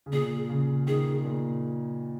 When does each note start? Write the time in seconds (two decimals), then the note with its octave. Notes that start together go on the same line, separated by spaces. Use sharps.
0.06 C#3
0.12 A#2 G#4
0.49 C#3
0.87 D#3 G#4
1.25 A#2